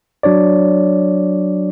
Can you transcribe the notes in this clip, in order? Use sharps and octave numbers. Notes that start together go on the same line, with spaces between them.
F#3 D4 C#5 D5